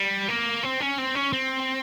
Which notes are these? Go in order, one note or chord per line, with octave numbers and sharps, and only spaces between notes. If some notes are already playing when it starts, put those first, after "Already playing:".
Already playing: G3
A#3
C4
C#4
C4
C#4
C4